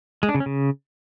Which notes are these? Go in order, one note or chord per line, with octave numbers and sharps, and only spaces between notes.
G#3
D4
C#3
C#4
C#3